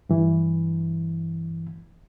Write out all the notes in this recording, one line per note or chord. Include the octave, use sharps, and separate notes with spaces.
G2 E3